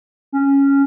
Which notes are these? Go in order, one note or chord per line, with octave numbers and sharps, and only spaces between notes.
C#4